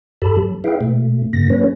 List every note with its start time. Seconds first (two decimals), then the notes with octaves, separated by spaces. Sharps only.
0.22 G2 G4 A4 A5 B5
0.37 F#3
0.64 E4 G#4 B4 E5 F5 G5
0.81 B2 A3
1.33 G2 C#3 A#3 A#6
1.50 F#3 A#3 C#4 B4 C#5